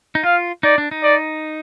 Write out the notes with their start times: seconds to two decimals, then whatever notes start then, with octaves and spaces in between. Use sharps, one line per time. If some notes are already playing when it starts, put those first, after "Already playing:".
0.15 D#4
0.24 F4 F5
0.63 D#4 D5
0.78 D4
0.91 D#4
1.03 D5